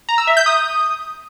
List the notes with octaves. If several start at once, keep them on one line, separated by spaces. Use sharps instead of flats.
A#5
E6
E5
G6
D#6